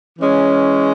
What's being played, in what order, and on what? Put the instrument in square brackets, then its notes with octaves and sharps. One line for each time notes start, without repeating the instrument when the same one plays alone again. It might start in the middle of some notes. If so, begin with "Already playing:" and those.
[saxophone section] E3 G#3 C#4